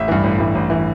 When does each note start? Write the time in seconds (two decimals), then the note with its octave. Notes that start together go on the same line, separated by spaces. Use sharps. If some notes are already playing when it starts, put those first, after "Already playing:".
Already playing: A1 E5
0.08 G2 E3
0.24 A1
0.38 G2 E3
0.55 A1
0.70 E3